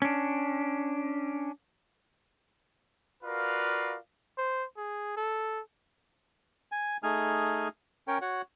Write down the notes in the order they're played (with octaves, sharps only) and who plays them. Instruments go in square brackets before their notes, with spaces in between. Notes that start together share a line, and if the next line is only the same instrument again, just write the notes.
[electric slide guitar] C#4 D4
[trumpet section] F4 F#4 A#4 B4 D5 F5
[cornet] C5
G#4
A4
[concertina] G#5
A3 D#4 G#4 G#5 F6
C#4 A#4 C#5 G5
F#4 C#5 F#5